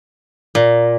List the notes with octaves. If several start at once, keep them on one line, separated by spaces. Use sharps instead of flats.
A#2